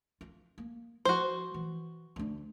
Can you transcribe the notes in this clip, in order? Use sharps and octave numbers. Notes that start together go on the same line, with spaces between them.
F4
A#3
F3 F#4 C5
E3
D2 D4